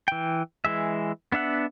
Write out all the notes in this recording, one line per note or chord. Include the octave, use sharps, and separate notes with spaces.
E3 G5
E3 G#3 E5
B3 D4 E5 F#5